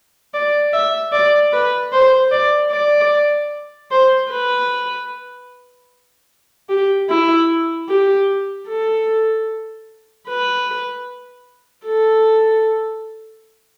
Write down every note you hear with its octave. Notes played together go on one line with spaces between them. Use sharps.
D5
E5
D5
B4
C5
D5
D5
C5
B4
G4
E4
G4
A4
B4
A4